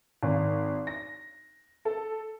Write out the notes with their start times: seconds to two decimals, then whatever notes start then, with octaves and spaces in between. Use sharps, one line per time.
0.23 G#1
0.87 A#6
1.85 A4